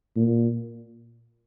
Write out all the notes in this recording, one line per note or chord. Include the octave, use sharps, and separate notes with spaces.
A#2